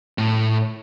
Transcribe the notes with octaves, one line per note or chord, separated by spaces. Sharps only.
A2